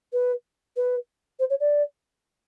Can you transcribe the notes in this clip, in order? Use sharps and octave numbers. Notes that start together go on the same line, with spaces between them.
B4
B4
C5
C#5
D5